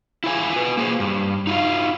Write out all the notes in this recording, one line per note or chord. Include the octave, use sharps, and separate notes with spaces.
E4 F4 G#4 B4 G#5
F#4 B4
A#3 G#4 C5
G2
D#4 F4 F#4 F5